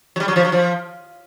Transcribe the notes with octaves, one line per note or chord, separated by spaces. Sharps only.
F#3
G3
F#3
F3
F#3
F3